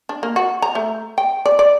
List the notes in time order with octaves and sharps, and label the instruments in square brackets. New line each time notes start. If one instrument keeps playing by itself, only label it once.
[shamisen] D4
A#3
F#4
A#5
A3
G5
D5
D5